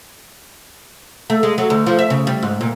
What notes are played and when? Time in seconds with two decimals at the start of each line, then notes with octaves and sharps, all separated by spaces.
1.30 A3
1.43 G#3
1.58 F#3
1.70 D2
1.86 F3
1.99 E5
2.10 C#3
2.27 G3
2.43 G#2
2.61 A#2